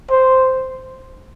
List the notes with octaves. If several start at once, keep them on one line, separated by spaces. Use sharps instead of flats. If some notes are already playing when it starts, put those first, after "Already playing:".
C5